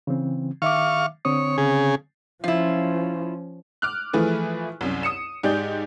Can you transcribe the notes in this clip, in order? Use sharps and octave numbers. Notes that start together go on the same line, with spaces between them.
C#3 E3 C4
D#3 E5 F5 C#6 D6
D3 C4 C#5 D#6
C#3 G#4
F3 C#4 E4 F4
D6 F6 F#6
E3 F3 A3 E4 G#4 B4
C2 F#2
D#6 C#7 E7
G#2 D#4 G4 G#4 D5 G6